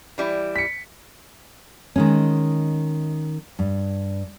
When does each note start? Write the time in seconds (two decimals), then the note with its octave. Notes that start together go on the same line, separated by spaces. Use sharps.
0.18 E3 G3 E4
0.56 B6 C#7
1.96 D#3 G#3 C#4
3.59 G2